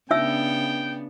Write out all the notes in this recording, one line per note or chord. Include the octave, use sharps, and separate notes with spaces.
C#3 B3 D4 D#4 E5 G5 E6